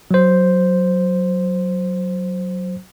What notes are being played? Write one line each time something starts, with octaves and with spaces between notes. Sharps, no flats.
F#3 C5